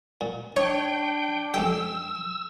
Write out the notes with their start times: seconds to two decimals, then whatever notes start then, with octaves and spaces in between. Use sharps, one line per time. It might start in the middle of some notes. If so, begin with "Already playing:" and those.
0.21 A#2
0.56 D4 D#4 C#5 G5
1.54 F2 G#3 G4 G5 E6